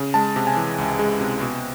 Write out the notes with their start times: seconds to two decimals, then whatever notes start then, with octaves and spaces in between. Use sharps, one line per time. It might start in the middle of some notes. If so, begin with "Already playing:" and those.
Already playing: C#3
0.14 G#3 A5
0.36 C3
0.47 G#5
0.57 E3
0.78 C#2
0.99 G#3
1.21 C3
1.41 B2